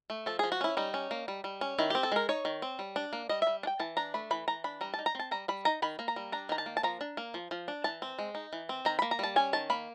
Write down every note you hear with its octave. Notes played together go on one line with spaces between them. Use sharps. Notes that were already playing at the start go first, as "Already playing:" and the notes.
A3
F3 A4
F3 G#4
F#4
C#4 E4
G3 D#4
C#4
A#3
G3
G3
C#4
D#3 E4
C4 G4
A4
G#3 A#4
D#4 C#5
D#3
C4
G3
D4
A#3
G3 D#5
G3 E5
D4
G5
E3 A5
D4 A#5
A3 B5
E3 B5
E3 A#5
D4 B5
G3 A#5
D#4 A5
A#5
C4 A5
G3 A#5
G3 B5
D#4 A#5
D#3 B5
A#3
A#5
G3
D4 A#5
D#3 A#5
A5
A#3
A5
F3 A#5
D4
A#3
F3
F3
D4
E3 A5
C4
G#3
D#4
E3
C4
D#3 A#5
A#3 B5
A#5
G3 A5
C#4 G#5
D#3 A5
A#3 B5